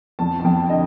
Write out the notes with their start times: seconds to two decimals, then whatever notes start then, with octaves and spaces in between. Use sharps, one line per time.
0.19 F2 A5
0.40 A5
0.44 F2 G5
0.69 D3 D#5